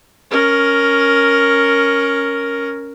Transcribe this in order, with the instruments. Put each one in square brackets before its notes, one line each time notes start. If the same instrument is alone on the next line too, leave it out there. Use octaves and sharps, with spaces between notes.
[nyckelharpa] C#4 A#4